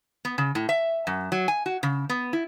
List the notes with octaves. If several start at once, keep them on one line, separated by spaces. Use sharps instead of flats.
B3
C#3
A2
E5
F#2
F#3
G#5
F#4
C#3
B3
E4